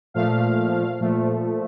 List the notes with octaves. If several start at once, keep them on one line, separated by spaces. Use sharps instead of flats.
A#2 F3 A3 F5
A#2 F3 A3